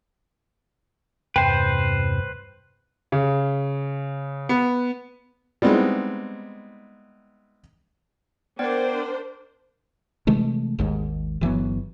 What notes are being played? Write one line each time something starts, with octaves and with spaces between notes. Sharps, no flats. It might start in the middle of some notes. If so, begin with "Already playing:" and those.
E2 G2 C3 B4 C5 G5
C#3
B3
G3 G#3 B3 C4 D#4 E4
B3 D4 A#4 C5 D5 G5
C3 E3 G#3 A3
G#1 D#2 G#2
G1 E3 F#3 B3